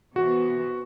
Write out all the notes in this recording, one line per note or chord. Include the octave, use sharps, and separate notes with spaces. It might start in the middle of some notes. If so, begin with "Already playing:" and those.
C3 E3 B3 F#4